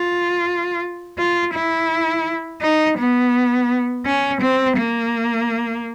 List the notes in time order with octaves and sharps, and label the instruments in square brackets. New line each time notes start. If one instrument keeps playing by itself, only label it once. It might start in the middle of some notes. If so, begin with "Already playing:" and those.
Already playing: [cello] F4
F4
E4
D#4
B3
C#4
C4
A#3